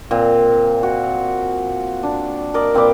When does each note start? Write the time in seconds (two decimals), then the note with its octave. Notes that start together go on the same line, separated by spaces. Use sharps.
0.11 A#2 C4
0.83 F#4
2.03 D4
2.54 A#4 D5 D#5
2.74 A#2 C4 B4 D5